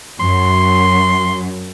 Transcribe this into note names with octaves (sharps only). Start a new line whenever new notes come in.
F#2 C6